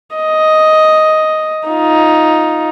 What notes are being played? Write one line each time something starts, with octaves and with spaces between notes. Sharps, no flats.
D#5
D#4 F4